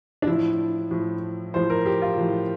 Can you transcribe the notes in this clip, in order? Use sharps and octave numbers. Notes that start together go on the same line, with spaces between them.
D4
A2 F3 E4
A2 F3
A2 F3 C5
A#4
G4
F4
A2 F3